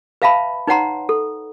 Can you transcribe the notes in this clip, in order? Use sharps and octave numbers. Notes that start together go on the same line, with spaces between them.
B4 E5 F5 A5 B5
D#4 B4 C#5 F#5 A#5 C6
A4